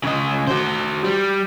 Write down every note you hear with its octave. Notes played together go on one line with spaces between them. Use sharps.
C#3 D#5
F#4 C5
G3